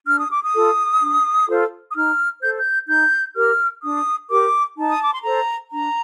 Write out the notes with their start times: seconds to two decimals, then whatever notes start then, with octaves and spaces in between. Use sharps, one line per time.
0.07 D4 F6
0.19 D#6
0.32 D6
0.44 D#6
0.53 F4 A4
1.01 D4
1.47 F4 A4 C5
1.90 D#6
1.94 D#4 F6
2.41 A4 C5 G6
2.58 G6
2.89 D#4 G6
3.35 G4 A#4 F6
3.83 D4 D#6
4.30 G4 A#4 D6
4.77 D#4 A5
4.91 D#6
5.03 D6
5.13 C6
5.24 A4 C5 A#5
5.71 D4 A#5